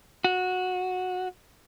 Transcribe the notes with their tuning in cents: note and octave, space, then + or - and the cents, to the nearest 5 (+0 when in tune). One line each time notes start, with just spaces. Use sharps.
F#4 -15